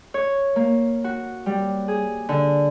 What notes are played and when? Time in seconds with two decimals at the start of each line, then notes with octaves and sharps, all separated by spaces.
0.14 C#5
0.56 A#3
1.04 F#4
1.46 G3
1.88 G#4
2.29 D3